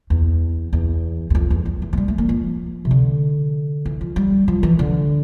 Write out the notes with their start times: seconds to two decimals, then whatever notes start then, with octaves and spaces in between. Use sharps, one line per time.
0.10 E2
0.73 E2
1.30 E2
1.35 F2
1.50 E2
1.65 F2
1.82 E3
1.93 A3
1.97 G3
2.08 A3
2.18 A#3
2.29 F3
2.85 C3
2.91 D3
3.86 E3
4.01 F3
4.16 G3
4.48 F3
4.63 E3
4.79 D3